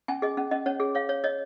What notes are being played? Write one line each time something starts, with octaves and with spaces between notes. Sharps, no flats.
C#4 G#5
G#4 D#5
C#4
C#4 D#5
C#4 C#5
G#4
C#5 F5
C#5
C#5 D#5